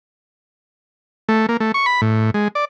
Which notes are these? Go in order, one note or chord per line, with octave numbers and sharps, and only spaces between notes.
A3
A#3
A3
C#6
B5
A2
G#3
D5